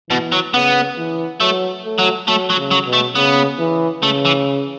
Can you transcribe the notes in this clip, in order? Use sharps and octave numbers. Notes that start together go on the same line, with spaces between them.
B2 E3
F#3
C#3 B3
E3
F#3 A3
A3
F#3
F#3 A3
F#3
C#3
F#3
B2
A3
C#3 B3
E3
C#3 A3
E3